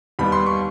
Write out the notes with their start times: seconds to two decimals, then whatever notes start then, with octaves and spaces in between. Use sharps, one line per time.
0.19 D#2 D#3 G3 B3 B5
0.32 C6
0.46 C#6